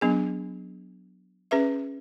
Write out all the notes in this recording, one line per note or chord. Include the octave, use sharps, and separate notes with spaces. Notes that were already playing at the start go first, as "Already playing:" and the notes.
F#3 B3 D4 G#4
C#4 G#4 B4 E5